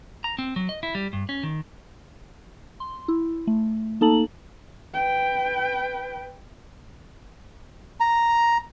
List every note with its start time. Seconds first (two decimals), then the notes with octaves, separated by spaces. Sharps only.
0.24 A#5
0.39 C4
0.56 F#3
0.69 D#5
0.83 E4
0.95 G3
1.13 G2
1.29 C#4
1.43 D#3
2.80 C6
3.08 E4
3.47 A3
4.01 A#3 D#4 A4 A5 A#5 F#7
4.94 B4 G5
8.00 A#5